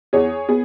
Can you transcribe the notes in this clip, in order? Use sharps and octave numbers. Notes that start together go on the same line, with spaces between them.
E2 G#4 C#5
B3 G#4